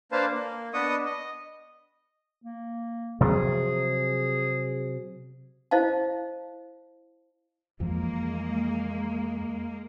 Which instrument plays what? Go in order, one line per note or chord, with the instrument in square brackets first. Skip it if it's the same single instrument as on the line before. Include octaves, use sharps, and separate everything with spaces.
[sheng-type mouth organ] A#3 D4 B4 C5 F5 A5
A#3
B3 D4 B4 D#5 C#6 D#6
D#5
[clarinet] A#3
[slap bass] C3 F3 F#3 [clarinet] G#4
[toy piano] E4 C5 D#5 F5 A5
[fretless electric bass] F2 E3 F3 [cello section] G#3 A#3